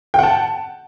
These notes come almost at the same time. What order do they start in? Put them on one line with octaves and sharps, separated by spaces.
G5 F#5 A5